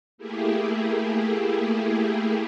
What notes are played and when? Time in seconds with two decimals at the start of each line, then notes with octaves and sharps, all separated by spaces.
0.18 A3 A#3 E4 G4 G#4